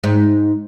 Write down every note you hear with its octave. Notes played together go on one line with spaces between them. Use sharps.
G#2